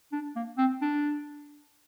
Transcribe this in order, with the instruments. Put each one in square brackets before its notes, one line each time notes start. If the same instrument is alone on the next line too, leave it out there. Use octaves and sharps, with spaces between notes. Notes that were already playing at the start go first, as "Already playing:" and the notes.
[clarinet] D4
A#3
C4
D4